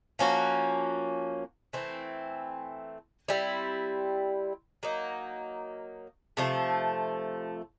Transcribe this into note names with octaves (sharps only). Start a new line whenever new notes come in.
F3 A#3 C#4 F#4
E3 A3 C4 E4
G3 C4 E4
F#3 A#3 D#4
C3 F3 A3